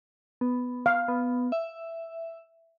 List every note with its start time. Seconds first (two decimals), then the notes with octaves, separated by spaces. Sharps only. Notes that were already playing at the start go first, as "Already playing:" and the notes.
0.41 B3
0.86 F5
1.08 B3
1.52 E5